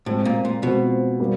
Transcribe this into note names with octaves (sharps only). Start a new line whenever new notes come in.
A2 F3 G#3 C4
A#2
A#2
B2 F3 G#3 C4
G3 A#3